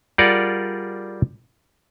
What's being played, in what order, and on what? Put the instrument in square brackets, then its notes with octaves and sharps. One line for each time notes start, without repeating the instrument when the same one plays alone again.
[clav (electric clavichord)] G3 F4 G#4 A#4 D5 F#5